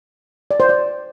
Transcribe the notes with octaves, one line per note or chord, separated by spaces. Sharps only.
D5
C5
D5